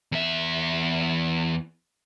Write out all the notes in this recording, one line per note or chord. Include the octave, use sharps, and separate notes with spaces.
E2 E5